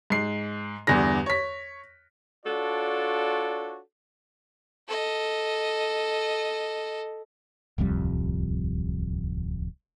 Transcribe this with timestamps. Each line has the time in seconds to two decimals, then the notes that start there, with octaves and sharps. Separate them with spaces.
0.10 G#2 C7
0.87 E2 G2 D3 A#6
1.26 C#5 B6
2.46 D4 F4 F#4 A4 C#5 D5
4.88 A4 D#5
7.78 D1 C2 F2 G3